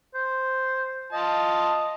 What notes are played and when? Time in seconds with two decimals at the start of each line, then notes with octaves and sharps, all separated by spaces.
0.15 C5
1.13 F4 D#5 A5